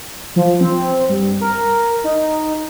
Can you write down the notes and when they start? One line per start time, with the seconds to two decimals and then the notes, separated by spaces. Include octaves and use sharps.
0.36 F3
0.61 C4
1.09 G2
1.41 A#4
2.04 D#4